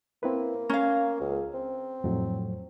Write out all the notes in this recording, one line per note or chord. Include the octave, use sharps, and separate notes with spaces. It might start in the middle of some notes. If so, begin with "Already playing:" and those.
A#3 C4 E4 B4
C#4 F5 A#5 F6 G#6
C#2
C4
F2 A2 F#3